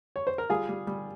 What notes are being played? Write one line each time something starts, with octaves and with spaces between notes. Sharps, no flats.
C#5
C5
A#4
G3 F4 G#4
G3
G3